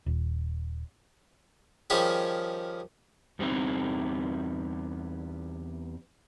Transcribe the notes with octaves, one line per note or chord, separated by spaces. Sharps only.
D#1
D#3 F3 G3 C#4 G4 G#4
E2 G3 B3 C4 D#4